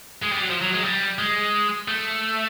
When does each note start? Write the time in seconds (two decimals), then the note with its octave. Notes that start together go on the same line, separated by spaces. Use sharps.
0.22 G#3
0.32 G3
0.41 F#3
0.50 F3
0.61 F#3
0.73 G#3
0.84 G3
1.19 G#3
1.88 A3